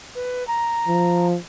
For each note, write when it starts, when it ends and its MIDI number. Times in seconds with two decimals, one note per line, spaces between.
0.15 0.46 71
0.48 1.27 82
0.87 1.37 53